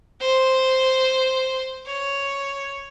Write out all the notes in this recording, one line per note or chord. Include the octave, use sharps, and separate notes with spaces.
C5
C#5